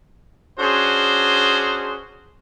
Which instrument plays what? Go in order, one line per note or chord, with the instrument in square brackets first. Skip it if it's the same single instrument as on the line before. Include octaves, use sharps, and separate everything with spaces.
[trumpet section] C#4 D4 F#4 G#4 C5